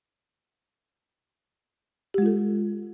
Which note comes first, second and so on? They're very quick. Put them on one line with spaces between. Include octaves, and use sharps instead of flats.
G4 G#3 F4 A4